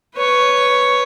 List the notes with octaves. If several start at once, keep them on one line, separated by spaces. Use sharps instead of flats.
B4 C#5